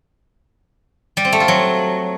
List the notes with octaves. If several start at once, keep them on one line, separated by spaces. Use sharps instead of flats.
G3
C4
A3
F4
F#3